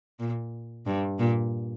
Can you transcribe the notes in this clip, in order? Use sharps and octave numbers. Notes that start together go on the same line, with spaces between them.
A#2
G2
A#2